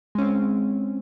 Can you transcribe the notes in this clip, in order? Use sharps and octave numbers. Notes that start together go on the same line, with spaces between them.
G#3 C4 C#4